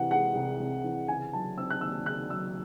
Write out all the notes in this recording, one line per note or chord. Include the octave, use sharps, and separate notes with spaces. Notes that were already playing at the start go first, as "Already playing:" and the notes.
Already playing: C3 E3 F#5
G#3 F#5
C2
C3
E3
C#3 G#5
F#3 A5
C4 E6
F#6
D#2 E6
C#3 F#6
F#3 E6